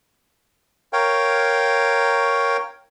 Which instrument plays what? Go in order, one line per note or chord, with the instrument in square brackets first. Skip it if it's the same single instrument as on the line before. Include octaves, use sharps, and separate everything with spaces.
[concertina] A#4 C#5 F5 G5